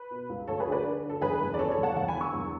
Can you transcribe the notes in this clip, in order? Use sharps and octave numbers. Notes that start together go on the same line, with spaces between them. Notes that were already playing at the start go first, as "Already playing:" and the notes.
Already playing: B4
B2
C#2
D2 A4 C#5
G#4 B4
D3
B4 D5
D3
D3
A4
E2 G#4 B4
E2
D5
C#3 A4 C#5
A4 C#5
E2
F#5 A5
E2 F#5 A5
G#5 B5
D3
C#6 E6
E2